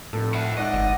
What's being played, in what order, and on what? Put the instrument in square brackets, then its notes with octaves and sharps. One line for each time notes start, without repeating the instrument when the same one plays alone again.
[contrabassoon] F1 [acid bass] A2 [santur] A4
[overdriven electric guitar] E5 F#5
[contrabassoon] G#2 [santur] D5 F#5 [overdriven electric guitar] D#5
[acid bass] G1